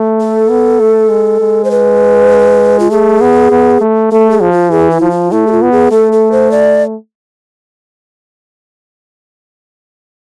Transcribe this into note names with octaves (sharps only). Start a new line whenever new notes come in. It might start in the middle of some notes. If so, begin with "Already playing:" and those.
Already playing: A3
A4
B3
A3
G#3
G#3
C5
B4
F4
A3 G#4
B3
B3
A3
A3 A4
G#4
F3
F4
E3 G#4
E4
F3
F4
A3 E4
G#4
F4
B3
G#4
A3 A4
A4
C5
D5